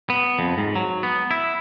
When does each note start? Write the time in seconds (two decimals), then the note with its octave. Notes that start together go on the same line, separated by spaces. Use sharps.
0.10 B3
0.39 F2
0.58 G#2
0.75 F#3
1.03 B3
1.31 E4